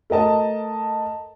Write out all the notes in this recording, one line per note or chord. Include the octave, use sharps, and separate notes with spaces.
A3 A#4 D#5 A5